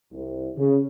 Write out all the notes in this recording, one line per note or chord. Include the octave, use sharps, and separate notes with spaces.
C2
C#3